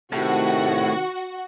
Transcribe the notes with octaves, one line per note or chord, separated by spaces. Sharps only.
A2 C3 D#3 F#4